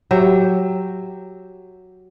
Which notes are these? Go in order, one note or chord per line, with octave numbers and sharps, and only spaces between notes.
F#3 G4 E5